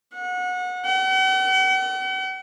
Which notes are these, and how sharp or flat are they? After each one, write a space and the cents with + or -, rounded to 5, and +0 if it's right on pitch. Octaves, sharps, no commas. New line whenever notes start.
F#5 -30
F#5 +45